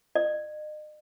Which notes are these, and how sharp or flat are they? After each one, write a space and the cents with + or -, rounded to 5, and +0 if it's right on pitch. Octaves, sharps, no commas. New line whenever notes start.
D#5 -40